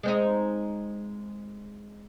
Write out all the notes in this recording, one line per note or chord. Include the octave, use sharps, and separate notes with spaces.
G#3 C4 D#4